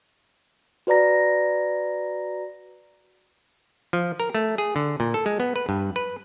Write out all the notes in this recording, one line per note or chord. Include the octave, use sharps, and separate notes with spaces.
F#4 B4 D5 A#5 A#6
F3
A#4
A3
G#4
D3
A#2
A4
G#3
B3
B4
G2
B4